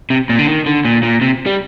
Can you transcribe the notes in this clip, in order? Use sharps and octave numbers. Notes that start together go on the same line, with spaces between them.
C3
A#2
D3
D#3
D3
A#2
A#2
C3
G3